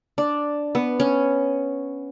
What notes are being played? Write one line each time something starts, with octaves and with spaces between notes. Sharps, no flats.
D4
B3
C#4